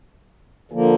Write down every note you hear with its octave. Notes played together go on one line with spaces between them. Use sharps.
D3 F3 A#3